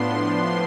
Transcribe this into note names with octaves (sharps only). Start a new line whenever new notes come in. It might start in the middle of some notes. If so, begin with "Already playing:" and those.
Already playing: A2 F3 B3 D4 C6